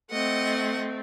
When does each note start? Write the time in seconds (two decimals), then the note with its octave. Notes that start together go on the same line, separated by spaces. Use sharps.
0.11 A3 C4 D#5 F#5